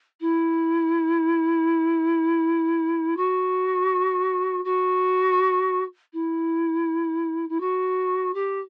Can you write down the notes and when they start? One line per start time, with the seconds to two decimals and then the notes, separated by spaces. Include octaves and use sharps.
0.20 E4
3.17 F#4
4.64 F#4
6.13 E4
7.49 E4
7.60 F#4
8.34 G4